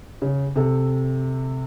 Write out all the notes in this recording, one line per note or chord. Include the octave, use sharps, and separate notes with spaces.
C#3
C3 A4